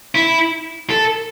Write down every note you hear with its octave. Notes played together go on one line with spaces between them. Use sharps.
E4
A4